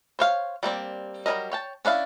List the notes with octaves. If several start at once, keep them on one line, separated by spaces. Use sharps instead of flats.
C5 C#5 F5
G3 A#3 C4 D5
F#3 G3 C#4 A#4 D#5
C#5 G5 A5
C#4 D4 E4 F5